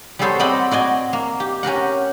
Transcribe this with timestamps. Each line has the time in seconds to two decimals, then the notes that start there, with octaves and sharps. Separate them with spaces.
0.19 G3 B3 G#4 A4 C5 C#5
0.39 C4 A4 D5 D#5 F#5 B5
0.71 F#4 D5 D#5 G#5
1.13 A#3
1.40 G4
1.63 C#4 G4 A#4 F#5